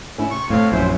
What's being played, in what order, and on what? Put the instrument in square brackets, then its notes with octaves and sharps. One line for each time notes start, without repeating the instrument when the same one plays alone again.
[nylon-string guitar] C#4 E4
[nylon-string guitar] C3 [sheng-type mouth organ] C#6
[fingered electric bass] A2 [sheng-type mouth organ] C4 C#5 F5
[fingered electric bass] A#1 F#2 [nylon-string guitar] F#3 C#4 F4 [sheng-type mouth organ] E4 C5